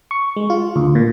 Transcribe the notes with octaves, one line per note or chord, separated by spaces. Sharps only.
C#6
G#3
F4
D2
A#2